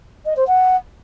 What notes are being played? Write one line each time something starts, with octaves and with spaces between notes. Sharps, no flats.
D#5
C5
F#5